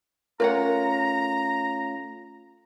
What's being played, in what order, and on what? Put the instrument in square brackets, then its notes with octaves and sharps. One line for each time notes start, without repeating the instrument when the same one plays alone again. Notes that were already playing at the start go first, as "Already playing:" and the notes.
[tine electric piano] A3 C#4 F4 [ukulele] A#4 C#5 F#5 [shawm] A#5